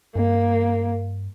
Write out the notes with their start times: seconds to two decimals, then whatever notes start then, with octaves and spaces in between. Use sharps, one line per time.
0.16 G2 A#3